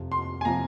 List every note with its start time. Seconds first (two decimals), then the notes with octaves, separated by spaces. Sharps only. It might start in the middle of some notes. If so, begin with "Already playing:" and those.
Already playing: F2 C3 F3
0.12 C6
0.41 G#5
0.45 C3 F3 A#5